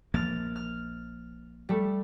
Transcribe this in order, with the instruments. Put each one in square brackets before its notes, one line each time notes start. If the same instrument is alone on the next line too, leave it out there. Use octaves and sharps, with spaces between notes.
[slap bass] A#1 F3 A#3 [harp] F6 A6
[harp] F6
G3 A3